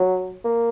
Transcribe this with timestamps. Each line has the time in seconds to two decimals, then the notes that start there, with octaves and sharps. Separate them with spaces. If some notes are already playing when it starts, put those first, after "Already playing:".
Already playing: F#3
0.45 A#3